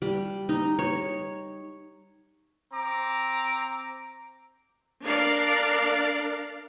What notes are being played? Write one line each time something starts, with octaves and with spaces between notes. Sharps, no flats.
G3
D#4
C#5
C4 A#5 D6
D4 A#4 D5 F5